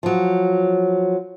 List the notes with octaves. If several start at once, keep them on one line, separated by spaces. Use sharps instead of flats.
F3 F#3